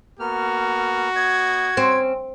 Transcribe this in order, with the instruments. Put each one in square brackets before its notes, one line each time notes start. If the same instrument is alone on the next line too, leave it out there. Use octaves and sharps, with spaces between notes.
[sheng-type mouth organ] A#3 B3 F6 [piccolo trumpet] F#4
[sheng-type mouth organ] B3 D#5 [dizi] G#6
[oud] C4 [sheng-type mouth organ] C#4